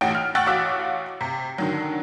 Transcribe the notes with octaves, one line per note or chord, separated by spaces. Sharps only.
A1 A2 F#5 G5 D7
F6
F#5 G5 C#6 E6 F#6 A6
A1 F#4 F5 D6 E6 B6
C3
D3 D#3 F#3